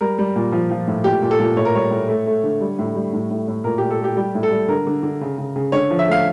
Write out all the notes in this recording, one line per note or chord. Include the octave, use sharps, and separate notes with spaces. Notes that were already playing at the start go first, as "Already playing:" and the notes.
G3 A#4
G3
A#2
F3
F3
A2
A#2 G4
A#2
A4
A#2
A2 C#5
A#4
G3 C#5
A2
A3
A3
D3
G3
A2
G3
A2
A2
A2
A#2 A#4
A#2 G4
A4
A3 G4
G3 G4
A2
A4
G3
D3 A#4
D3
D3
C#3
C#3
C#3
D3 C#5
F3
E5
A3 F5